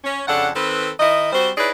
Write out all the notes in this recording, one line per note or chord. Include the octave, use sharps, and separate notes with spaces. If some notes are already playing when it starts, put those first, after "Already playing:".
C#4
F2 C#3 D4 A4 F#5
D#3 C4 A4 B4
D#3 D#4 E4 D#5
G3 C4 F#4 C5
D#4 E4 G#4 B4 C#5 D5